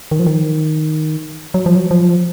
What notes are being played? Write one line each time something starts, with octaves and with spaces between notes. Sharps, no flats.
D#3
F3
D#3
F#3
F3
F#3
F3